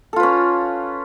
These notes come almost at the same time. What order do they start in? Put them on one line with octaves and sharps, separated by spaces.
A4 F4 B4 C#4